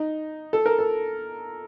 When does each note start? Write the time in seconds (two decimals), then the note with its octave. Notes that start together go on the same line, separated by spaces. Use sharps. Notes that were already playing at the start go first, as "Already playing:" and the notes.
Already playing: D#4
0.53 A4
0.66 A#4
0.79 A4